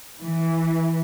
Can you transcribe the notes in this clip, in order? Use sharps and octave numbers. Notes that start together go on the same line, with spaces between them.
E3